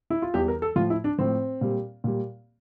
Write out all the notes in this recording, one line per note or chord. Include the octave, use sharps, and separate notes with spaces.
E4
F4
E2 E3 G3 G4
A#4
A4
A2 F3 F4
E4
D4
A2 F3 C4
A#2 G3
A#2 G3